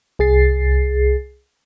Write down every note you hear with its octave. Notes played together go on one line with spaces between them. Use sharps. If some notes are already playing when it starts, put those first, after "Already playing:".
C2 G#4 A6 C7